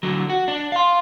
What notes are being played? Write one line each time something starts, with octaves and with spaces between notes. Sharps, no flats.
D3 F#3
F#4
D4
F5 C6